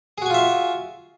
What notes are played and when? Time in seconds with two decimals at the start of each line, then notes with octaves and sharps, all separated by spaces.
0.18 G#4
0.22 F#4
0.26 G#5
0.30 F4
0.34 E5